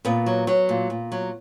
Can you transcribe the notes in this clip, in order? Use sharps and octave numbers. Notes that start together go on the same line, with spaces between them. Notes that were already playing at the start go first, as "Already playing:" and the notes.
A#2 B3
F#3
F#3
A#2
A#2
F#3